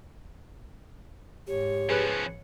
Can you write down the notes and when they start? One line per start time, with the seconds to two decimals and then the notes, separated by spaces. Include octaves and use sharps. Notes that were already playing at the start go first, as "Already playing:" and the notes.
1.47 G#2 G4 C#5
1.90 F3 C#4 G#4 B4 F#6